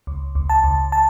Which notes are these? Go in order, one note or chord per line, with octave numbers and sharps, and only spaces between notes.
C#2
C#2
A5
C#2
A5